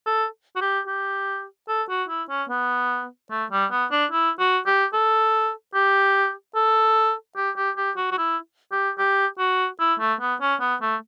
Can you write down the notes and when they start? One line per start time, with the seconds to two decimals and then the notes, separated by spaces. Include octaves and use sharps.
0.06 A4
0.56 F#4
0.61 G4
0.87 G4
1.68 A4
1.89 F#4
2.09 E4
2.29 C#4
2.49 B3
3.30 A3
3.51 G3
3.71 B3
3.91 D4
4.11 E4
4.39 F#4
4.66 G4
4.93 A4
5.74 G4
6.55 A4
7.36 G4
7.56 G4
7.77 G4
7.97 F#4
8.11 F#4
8.18 E4
8.72 G4
8.98 G4
9.38 F#4
9.80 E4
9.99 A3
10.21 B3
10.41 C#4
10.60 B3
10.81 A3